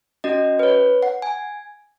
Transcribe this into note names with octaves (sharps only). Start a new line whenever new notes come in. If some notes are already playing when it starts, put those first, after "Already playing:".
C#4 F#4 D#5
B4
C#5
F#5
G#5